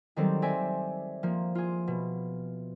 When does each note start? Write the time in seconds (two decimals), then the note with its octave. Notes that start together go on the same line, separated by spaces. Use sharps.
0.16 D#3 F#3 G3 C4 G4 A4
0.42 C4 D5 E5 G#5
1.23 F3 A#3
1.55 F4 G#4
1.87 B2